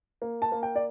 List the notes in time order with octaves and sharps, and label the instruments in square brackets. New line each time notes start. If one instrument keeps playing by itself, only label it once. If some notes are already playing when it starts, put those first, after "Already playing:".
[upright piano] A#3
A5
A#3
G5
D5